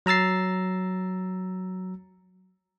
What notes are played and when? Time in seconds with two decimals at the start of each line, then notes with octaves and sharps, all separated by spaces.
0.06 F#3 A#5 E6 A6 C7